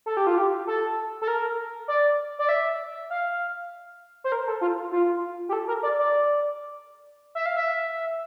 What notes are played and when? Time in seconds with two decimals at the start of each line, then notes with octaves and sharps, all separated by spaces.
0.06 A4
0.17 G4
0.27 F4
0.38 G4
0.67 A4
1.22 A4
1.28 A#4
1.88 D5
2.39 D5
2.49 E5
3.10 F5
4.24 C5
4.32 A#4
4.47 A4
4.61 F4
4.92 F4
5.49 G4
5.53 A4
5.68 A#4
5.83 D5
5.99 D5
7.35 E5
7.46 F5
7.57 E5